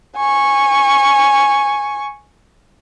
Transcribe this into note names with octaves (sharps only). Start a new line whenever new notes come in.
G#5 C#6